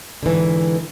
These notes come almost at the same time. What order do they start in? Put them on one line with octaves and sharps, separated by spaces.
D3 E3 G#2